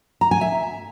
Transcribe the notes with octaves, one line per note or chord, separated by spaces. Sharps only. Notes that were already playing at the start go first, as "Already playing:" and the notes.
A#5
G#5
E5